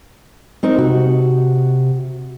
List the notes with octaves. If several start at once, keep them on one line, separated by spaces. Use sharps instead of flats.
C4 D#4 A#4
C3 F#4